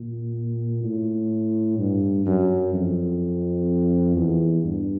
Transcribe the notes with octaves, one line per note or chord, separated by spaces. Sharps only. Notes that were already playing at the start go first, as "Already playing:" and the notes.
Already playing: A#2
A2
G2
F#2
F2
E2
G2